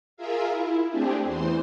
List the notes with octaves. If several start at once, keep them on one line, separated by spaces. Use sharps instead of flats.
F4 G#4 A#4 E5 F5
E4
A3 C4 D4 G4 G#4
E2 E3 C5 C6